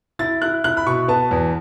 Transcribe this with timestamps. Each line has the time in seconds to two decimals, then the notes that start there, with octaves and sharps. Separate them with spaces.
0.19 E4 A6
0.42 E4 F#6
0.64 E4 F#6
0.77 B5
0.86 B2 C#6
1.08 B3 A5
1.31 E2